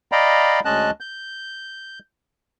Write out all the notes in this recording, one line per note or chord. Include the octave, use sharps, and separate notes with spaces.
D5 D#5 F5 G5 A#5 B5
D2 G#3 C#4 D#5 A5 F#6
G6